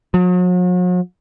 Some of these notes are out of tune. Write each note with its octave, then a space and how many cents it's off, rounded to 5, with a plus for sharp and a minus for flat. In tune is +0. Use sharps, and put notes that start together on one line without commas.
F#3 -45